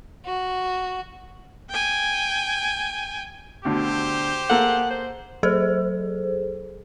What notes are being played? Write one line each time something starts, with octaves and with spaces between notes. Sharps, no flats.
F#4
G5 G#5
D2 B2 D3 G4 C5
A#3 G#4 A4 F#5
C5
F#3 G#4 A4 C5